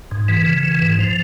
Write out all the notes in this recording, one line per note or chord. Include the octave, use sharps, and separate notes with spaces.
G#2
E3
C#3
E3
G#2
F3